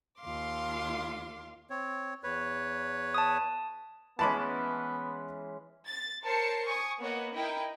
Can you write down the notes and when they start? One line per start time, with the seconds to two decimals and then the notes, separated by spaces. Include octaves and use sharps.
0.20 D#2 F4 F5 C6 D6
1.70 C4 C#5
2.23 E2 B4 C#5
3.14 A5 D#6
4.19 E3 G#3 B3 C#4 A5 B5 D6
5.87 A6
6.23 A#4 C5 C#5 A5 C7 C#7
6.67 G#5 C#6 D#6
7.00 A#3 B3 C#5 D#5 F#5
7.34 D#4 E4 A#4 D#5 G5